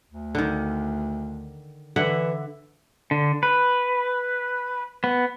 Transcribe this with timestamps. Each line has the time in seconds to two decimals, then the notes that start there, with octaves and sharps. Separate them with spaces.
0.10 D2
0.35 D3 D#3
1.96 D3 E3 E5 F#5
3.11 D3
3.43 B4
5.04 B3